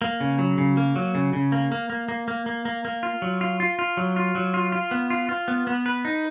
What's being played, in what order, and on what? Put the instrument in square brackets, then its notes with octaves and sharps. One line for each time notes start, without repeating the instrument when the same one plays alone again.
[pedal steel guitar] A#3
C#3
F#3
C#3
A#3
F#3
C#3
C#3
A#3
A#3
A#3
A#3
A#3
A#3
A#3
A#3
F4
F#3
F4
F4
F4
F#3
F4
F#3
F4
F4
B3
F4
F4
B3
B3
B4
D#4